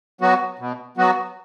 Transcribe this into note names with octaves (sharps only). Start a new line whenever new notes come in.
F#3 B3 F#4
B2
F#3 B3 F#4